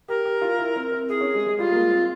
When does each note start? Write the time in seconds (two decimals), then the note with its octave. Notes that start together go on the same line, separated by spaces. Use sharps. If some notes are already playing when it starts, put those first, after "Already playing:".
0.08 G4 A#4
0.25 G4
0.42 F4
0.58 E4
0.76 C4
0.92 C4
1.08 E4 G#4
1.21 C#4
1.34 G#3
1.46 G#3
1.58 G3 F4
1.71 A#3
1.76 G#3
1.92 C4